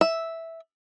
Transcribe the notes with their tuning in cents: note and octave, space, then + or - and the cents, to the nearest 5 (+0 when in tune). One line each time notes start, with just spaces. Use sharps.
E5 -5